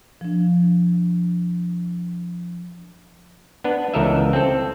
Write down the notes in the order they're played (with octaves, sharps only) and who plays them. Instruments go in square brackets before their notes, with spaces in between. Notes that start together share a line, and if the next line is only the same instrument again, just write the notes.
[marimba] F3 D4
[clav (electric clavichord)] B3 D4 B4
C#2 E3 A4 A#4 D#5 E5
C4 A4